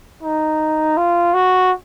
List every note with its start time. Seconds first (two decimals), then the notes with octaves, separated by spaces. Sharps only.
0.23 D#4
0.97 F4
1.34 F#4